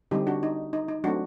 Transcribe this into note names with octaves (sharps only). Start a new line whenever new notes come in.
D3 G3 C4 D#4 G4
D4 F#4
D#4
D#4
D#4
F#3 A3 C4 D4 F#4